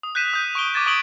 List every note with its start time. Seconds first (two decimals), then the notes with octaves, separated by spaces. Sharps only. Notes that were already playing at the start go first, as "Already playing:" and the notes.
0.03 D#6
0.15 F#6 G6 B6 D#7 E7
0.33 D#6 G6
0.55 C#6 D7 G7
0.74 D6 G#6 A6 E7
0.86 C#6 D#6 D7 F#7 G7